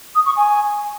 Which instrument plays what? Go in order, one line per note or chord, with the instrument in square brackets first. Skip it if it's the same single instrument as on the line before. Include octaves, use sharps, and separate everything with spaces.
[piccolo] D#6
C#6
G#5